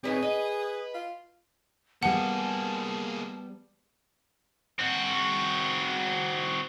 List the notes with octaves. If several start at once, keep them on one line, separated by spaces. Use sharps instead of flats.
A2 C4 D#4 G#4 B4 D5
B4 D#5
F4
G3 A#3 B3 G#4 F#5 A5
C4 F#4